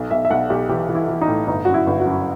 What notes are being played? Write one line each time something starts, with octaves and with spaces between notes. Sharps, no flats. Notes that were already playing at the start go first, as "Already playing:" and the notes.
Already playing: B1
B1 E5
E5
B1 F#5
B1 G4
E3 G4
E3
E4
E3
D#4
A2
G1 D#4
F#2 F#4
E4
G1
F#4
F#2